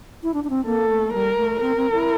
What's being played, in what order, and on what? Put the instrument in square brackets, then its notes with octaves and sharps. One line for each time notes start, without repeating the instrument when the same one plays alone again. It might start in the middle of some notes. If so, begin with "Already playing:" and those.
[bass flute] E4
D4
D4
C4
[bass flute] A#3 [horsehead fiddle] A4
[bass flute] A3
[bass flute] G3 [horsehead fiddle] A#4
[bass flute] A3
[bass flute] C4 [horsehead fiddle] A#4
[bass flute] C4
E4